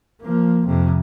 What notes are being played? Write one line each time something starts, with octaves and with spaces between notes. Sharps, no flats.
F3 A#3
F2 C3